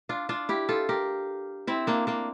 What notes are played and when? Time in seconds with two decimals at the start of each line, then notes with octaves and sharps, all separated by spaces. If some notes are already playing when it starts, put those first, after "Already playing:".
0.09 D4 F4
0.29 D4 F4
0.49 E4 G4
0.69 F4 A4
0.89 G4 A#4
1.67 C4 E4
1.87 A#3 D4
2.07 A#3 D4